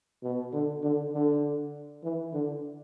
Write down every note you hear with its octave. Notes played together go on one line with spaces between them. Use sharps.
B2
D3
D3
D3
E3
D3